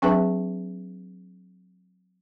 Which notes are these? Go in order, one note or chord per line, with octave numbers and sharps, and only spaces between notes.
F#3 C4 D4 G#4 B4 E5